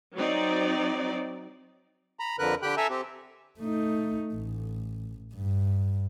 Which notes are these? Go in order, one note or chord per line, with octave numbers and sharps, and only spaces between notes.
F#3 C4 D#4 D5
A#5 B5
F2 D3 A#4 B4 F#6
D3 G4 G5 B5 F#6
A4 E5 G#5 A#5 E6
C4 G4
A3 D#4
A1
G2